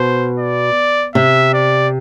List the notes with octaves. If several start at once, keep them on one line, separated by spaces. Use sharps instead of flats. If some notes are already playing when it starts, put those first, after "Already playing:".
Already playing: B2 C5
D5
C3 E5
D5